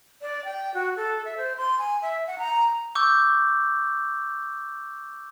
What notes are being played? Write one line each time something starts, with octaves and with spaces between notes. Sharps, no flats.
D5
G5
F#4
A4
E5
C5
C6
G#5
E5
F#5
A#5
C#6 D6 E6 G6